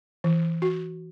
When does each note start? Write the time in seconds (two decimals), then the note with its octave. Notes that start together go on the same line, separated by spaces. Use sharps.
0.24 E3
0.62 F#4